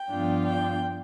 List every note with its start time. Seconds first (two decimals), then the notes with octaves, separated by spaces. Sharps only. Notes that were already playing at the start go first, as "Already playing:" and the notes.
Already playing: G5
0.10 G2 F3 B3 D4 F4
0.46 G5